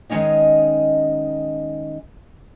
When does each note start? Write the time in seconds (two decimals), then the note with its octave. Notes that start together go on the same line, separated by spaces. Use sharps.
0.10 D#3 G#3 C4 C#4 D#4 D#5